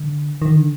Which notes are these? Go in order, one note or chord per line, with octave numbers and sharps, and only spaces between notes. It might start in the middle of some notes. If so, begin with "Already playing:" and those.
Already playing: D3
D#3
D3